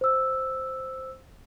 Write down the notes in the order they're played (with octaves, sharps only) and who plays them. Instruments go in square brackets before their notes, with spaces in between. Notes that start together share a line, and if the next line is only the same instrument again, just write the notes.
[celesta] C5 E6